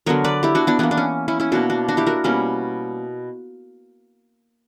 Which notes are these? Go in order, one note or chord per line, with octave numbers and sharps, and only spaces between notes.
D3 F#3 B3 A#4 C#5
B4 D5
E4 G4
D4 F#4
B3 D4
E3 A#3 B3 D4
D4
C#4
C#4 E4
C#4 E4
B2 A#3 D4 F#4
D4 F#4
D4 F#4
E4 G4
F#4 A#4
B2 G3 A#3 C#4